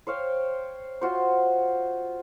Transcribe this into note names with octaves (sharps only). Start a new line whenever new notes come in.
C5 C#5 F5 G5
F4 F#4 C5